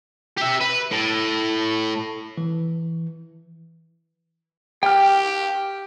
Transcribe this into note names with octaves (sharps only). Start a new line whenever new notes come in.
G4 E5
B4
A2
E3
G4 G5 F6